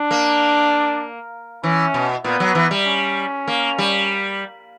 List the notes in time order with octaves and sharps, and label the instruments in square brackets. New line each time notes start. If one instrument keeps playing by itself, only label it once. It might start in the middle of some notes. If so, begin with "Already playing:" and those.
Already playing: [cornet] D4
[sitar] A#3
[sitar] E3 [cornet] C#4
[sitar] B2
[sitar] A#2 [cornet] B3
[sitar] F#3
E3
G3
[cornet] C#4
[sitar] A#3
G3